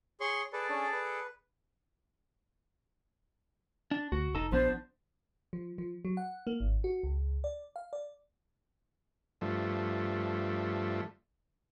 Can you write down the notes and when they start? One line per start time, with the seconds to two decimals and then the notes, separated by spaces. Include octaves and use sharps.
0.20 G#4 C#5 C6 C#6
0.53 G#4 A4 B4 D5
0.70 C#4 D4
0.92 B4
3.91 D4
4.12 D2 F#4
4.35 F1 D#4 A4
4.52 A#1 F3 B3 D4 C5
5.53 F3
5.78 F3
6.05 F#3
6.17 F#5
6.47 A#3
6.60 G#1
6.84 F#4
7.03 C#2
7.44 D5
7.76 F5
7.93 D5
9.41 G2 F3 A3